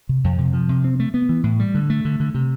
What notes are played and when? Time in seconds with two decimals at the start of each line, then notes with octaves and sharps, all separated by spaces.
0.09 C3
0.24 F2
0.38 C3
0.53 F3
0.69 C3
0.84 C4
1.00 A3
1.14 B3
1.29 E3
1.44 A2
1.60 G3
1.75 D3
1.90 A3
2.05 D3
2.20 D3
2.34 C3